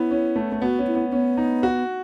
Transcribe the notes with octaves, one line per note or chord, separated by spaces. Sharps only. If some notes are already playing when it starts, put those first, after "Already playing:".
Already playing: B3 C#4 E4
C#4
A3
A3
B3 F#4
C#4
E4
B3
B3 C#4
D#4
F#4